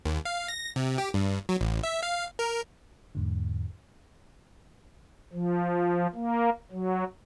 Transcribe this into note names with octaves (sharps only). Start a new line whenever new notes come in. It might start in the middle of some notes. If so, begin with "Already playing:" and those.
D#2
F5
A#6
C3
G4
G2
F#3
A1
E5
F5
A#4
E2 G#2 D3
F3
A#3
F#3